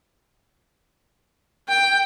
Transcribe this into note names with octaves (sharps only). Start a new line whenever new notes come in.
G5